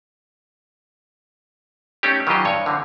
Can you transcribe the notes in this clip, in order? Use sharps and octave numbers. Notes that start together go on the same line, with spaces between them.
A3 C#4 D#4 G4
D#3 E3 F#3 F4 G4 D#5
G2 C#5
D3 E3 C4